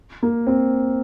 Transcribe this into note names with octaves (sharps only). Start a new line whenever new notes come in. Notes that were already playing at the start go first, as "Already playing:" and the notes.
A#3
C4